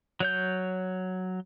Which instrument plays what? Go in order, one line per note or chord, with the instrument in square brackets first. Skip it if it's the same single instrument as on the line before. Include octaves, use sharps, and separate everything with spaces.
[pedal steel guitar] F#3 C#5 G6